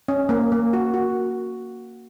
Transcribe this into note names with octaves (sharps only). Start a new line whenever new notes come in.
C#4
A#3
A#3
F#4
F#4